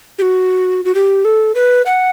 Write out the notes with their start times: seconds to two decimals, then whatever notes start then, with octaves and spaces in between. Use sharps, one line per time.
0.19 G4
0.22 F#4
0.85 F#4
0.95 G4
1.25 A4
1.55 B4
1.86 F#5